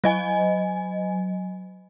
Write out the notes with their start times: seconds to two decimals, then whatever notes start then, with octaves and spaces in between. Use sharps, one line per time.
0.04 F#3 D#5 G#5